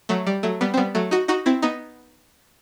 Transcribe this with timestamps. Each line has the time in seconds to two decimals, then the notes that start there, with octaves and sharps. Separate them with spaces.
0.09 F#3 A3
0.27 G3
0.43 F#3 A3
0.61 G3 B3
0.74 C4
0.77 G3 B3
0.95 F#3 A3
1.11 D#4 F#4
1.28 D#4 F#4
1.46 C4 E4
1.62 B3 D#4